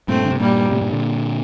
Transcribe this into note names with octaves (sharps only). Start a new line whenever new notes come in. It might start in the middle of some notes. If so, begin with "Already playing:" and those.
G2 A#2 A3 C4
D3
C3
G2 A#2 G3 A#3
A2 C3
G2 A#2
A#2 D3